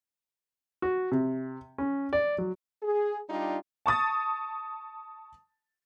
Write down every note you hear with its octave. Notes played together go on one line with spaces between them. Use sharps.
F#4
C3
C#4
D5
F#3
G#4
G3 D4 D#4 F4 G4
A5 C#6 D#6 A6